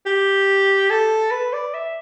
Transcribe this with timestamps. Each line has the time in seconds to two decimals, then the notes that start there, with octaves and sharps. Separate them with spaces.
0.06 G4
0.90 A4
1.31 B4
1.53 D5
1.74 E5